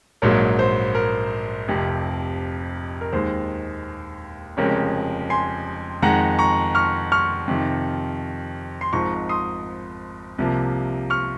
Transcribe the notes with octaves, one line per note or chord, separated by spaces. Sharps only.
A#1 G#2 F#3 A#3 A#4 C#5
C5
A#4
F1 F2 C3
A#4
D#2 D#3 G#3 C5
F1 F2 C#3 G#3 A#4 C#5
G#5 C6
F2 D#3 G#3 F#5 A#5
A#5 C#6
C#6 F6
C#6 F6
F2 C3 D#3
C6
G#1 G#2 F3 A#5 C#6
C6 D#6
C2 C3 F3 A#3
C#6 F6